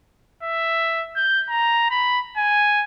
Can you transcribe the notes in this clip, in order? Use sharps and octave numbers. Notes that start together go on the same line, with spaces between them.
E5
G6
A#5
B5
G#5